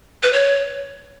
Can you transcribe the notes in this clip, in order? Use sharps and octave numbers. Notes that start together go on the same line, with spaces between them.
B4
C#5